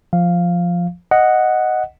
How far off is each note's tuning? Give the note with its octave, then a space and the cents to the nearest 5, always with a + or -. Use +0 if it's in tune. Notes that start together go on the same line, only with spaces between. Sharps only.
F3 +0 F5 +0
D#5 +0 F#5 +0